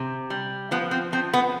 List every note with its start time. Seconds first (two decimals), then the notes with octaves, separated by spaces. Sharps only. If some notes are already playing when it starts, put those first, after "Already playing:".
Already playing: C3
0.30 G3
0.71 F3 B3
0.91 C4
1.12 F3 C4
1.34 B3